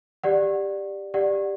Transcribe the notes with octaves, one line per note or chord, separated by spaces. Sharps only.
G4 D5 F#5
G4 D5 F#5